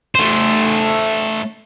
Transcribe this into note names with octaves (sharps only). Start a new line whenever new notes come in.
A3 C5